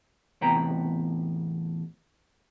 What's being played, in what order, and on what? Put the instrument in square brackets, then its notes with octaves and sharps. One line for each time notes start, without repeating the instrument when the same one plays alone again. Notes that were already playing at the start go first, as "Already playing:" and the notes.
[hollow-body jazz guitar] E2 A2 C3 B3 G5 A#5